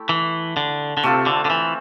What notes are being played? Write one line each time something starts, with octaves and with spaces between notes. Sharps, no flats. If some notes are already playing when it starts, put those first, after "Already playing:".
Already playing: A3 E4 G4
E3
D3
D3
C3 A3 C4 F4 A4
D3
D3
E3